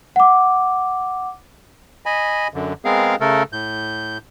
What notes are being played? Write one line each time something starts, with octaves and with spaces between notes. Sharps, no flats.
F#5 D6
D#5 G#5 B5
F#2 D3
G#3 B3 C4 G#4 A#4 F5
C#3 A3 A4 A#4
A2 G6